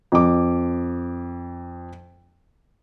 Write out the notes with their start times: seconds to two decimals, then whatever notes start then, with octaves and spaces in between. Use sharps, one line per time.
0.12 F2 D6